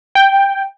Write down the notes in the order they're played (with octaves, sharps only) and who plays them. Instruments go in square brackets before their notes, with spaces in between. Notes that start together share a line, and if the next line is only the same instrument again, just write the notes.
[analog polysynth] G5